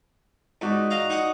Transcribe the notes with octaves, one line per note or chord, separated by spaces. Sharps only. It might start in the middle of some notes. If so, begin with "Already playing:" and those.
G#2 D#4 F#4 D5
D#5 F5 A#5
D#4 F#5 D#6